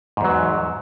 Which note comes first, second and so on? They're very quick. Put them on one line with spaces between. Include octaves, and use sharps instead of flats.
G#2 E2 F#3